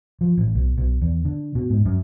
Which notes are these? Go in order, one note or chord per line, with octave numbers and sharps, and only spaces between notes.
F3
A1
B1
B1
E2
D3
B2
G#2
F#2